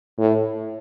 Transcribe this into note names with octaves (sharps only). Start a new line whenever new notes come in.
A2